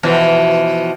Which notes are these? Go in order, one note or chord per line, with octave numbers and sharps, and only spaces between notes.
B2 E3 F3